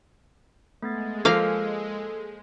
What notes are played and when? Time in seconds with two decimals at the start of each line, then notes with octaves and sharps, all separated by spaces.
0.82 G#3 A3 B3 A6
1.25 F3 A#3 A4 F5